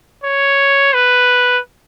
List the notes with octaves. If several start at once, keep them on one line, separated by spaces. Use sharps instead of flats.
C#5
B4